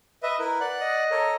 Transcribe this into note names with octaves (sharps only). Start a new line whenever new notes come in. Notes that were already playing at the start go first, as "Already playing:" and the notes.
B4 D#5 E5
E4 A#4 B4
D5 F#5 F#6
D#5
A4 A#4 C#5